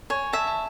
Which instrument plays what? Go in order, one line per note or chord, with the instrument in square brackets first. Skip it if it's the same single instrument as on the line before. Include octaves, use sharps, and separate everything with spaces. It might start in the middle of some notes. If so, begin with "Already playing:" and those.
[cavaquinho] C#5 [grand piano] G#5
[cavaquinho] E5 [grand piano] A5
[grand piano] A5